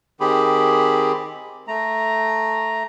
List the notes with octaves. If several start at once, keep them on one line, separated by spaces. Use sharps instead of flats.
D#3 C4 G4 G#4 B5
A3 A#5